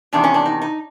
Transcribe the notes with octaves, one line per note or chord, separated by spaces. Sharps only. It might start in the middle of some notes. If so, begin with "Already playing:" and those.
E2 C3 D#3 D4
C#4
D4
D#4
D#4